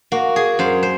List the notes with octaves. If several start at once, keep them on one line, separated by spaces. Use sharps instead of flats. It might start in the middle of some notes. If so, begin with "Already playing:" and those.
A#3 F#4
G#4
F#2 C5
C5